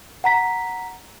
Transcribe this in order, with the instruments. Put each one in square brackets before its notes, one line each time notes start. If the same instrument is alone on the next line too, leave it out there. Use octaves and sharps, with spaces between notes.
[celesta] F#5 A#5 B6